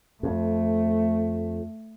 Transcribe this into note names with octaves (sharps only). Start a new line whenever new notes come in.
F2 A3